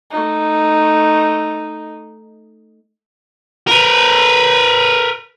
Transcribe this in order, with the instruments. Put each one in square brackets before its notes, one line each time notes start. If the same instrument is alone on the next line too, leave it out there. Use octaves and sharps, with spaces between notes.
[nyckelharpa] A3 D#4
[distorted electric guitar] A#4 B4